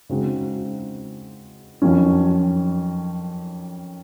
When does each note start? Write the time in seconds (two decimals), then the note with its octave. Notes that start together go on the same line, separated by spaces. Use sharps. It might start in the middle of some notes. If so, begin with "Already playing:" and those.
0.09 C#3 G#3 C4 D#4 F#4
1.82 F2 D#3 F#3 C#4